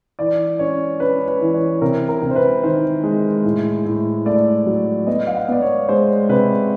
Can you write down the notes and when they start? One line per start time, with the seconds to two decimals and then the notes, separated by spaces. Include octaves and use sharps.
0.19 E3 D5
0.59 C#4 C#5
1.00 C#4 B4
1.28 B4
1.41 E3
1.54 C#5
1.81 C3 A#4
2.09 A#4
2.22 C3
2.31 C5
2.36 B4
2.63 D#3 C5
3.03 G#3
3.44 A2
3.86 A2
4.26 A3 D5
4.66 F#3
5.07 B3 D#5
5.27 F5
5.35 F#5
5.48 B3 D5
5.62 C#5
5.89 G#3 C5
6.29 C3 B4